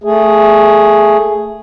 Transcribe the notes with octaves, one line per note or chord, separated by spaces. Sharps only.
A3 G#4